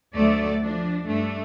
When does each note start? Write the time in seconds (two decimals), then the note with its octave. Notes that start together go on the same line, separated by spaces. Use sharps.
0.15 D2 F#3 A3 D5
0.62 F3 D4
1.05 G2 A3 D4